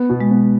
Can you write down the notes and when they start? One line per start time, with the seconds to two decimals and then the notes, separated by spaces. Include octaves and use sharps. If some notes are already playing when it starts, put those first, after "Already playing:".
Already playing: B3
0.09 B2
0.20 G#3
0.31 B3